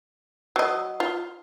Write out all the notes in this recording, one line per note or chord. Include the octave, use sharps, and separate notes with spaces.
F#3 D#5
F4